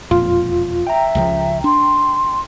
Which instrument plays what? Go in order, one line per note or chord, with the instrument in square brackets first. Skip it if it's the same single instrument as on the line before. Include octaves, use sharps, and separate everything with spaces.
[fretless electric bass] E1 F2 A#2 [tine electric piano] F4
[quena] E5 [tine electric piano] G5 A#5
[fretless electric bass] C#2 C#3 F3
[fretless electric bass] D4 [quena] C6